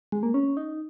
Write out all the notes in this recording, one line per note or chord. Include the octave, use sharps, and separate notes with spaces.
G#3
A#3
C#4
D#4